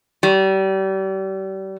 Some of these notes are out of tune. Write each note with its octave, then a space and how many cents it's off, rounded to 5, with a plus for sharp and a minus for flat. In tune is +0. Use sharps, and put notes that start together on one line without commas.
G3 -35